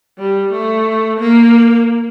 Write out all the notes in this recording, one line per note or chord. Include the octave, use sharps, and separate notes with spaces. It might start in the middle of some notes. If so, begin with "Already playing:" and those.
G3
A3
A#3